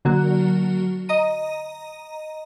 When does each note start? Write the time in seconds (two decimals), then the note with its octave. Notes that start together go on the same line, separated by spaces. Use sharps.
0.05 D3 F#3 A#3 F#4
1.09 D#5 A#5 D#7